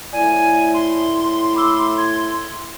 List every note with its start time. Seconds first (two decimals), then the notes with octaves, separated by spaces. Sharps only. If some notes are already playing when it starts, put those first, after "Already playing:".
0.13 A2 E4 D5 G#5
0.74 C6
1.54 B5 D6 E6
1.98 G#6